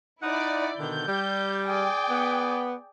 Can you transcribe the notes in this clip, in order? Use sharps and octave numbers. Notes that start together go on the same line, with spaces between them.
D#4 E4 D5 F#5
B2 D3 D#3 G6
G3
G#4 D5 G5
B3